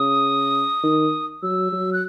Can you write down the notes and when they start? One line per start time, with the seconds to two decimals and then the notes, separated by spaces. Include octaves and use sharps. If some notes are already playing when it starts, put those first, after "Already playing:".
Already playing: C#3 D#6
0.84 D#3
1.43 F#3 E6
1.72 F#3
1.93 F#6